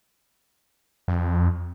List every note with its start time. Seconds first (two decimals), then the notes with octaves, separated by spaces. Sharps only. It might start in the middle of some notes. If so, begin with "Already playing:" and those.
1.08 F2